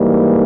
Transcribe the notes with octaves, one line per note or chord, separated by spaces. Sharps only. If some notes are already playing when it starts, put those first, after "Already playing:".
Already playing: G#2 E3 G3 A#3